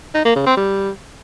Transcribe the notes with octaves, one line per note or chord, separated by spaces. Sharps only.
D#4
A#3
C#3
C4
G3